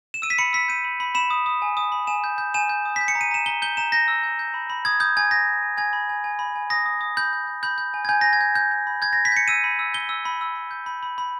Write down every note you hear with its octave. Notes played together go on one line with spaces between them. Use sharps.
E7
E6 D#7
B6
B5 C#7
E6 B6
G6 D#7
B5
B5
B5 E7
D#6
D#6
G#5
D#6
B5
G#5 E7
G6
G6
G#5 E7
G6
D#6
G6 B6
C#7
A#5
D#7
A#5 E7
A#5 G7
G6 G7
A#5 E7
G6 A#6
E6
G6
G6
B5
B5
D#6 G#6
D#6 G6
G#5 G#6
G6 A#6
G6
G#5
G#5 G#6
B5
G#5
G#5
B5
G#5
D#6 A#6
D#6
D#6
B5 G6
G6
G6
B5 G6
G6
G#5
G#6
G#5 G6
G#5 A#6
G#6
G6
G6
G6
B5
G6 G#6
A#6
G6
B6
G6 C#7
E6 D#7
B5
E6
G6 G7
E6
B5
E6
B5
G6
B5
B5
B5